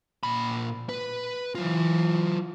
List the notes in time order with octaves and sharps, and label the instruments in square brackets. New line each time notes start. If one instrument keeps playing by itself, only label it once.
[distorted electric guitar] A#2 B5
B4
[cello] E3 [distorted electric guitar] F#3 F4